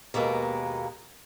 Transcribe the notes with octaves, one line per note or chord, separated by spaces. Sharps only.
D#2 B2 G#3 A#3 B3